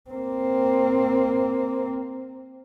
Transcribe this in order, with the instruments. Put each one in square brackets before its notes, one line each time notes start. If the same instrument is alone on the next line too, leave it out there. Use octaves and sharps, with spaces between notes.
[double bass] A#3 C4